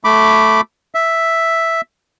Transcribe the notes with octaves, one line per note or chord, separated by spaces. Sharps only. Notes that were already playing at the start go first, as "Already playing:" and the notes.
A3 B5 D6
E5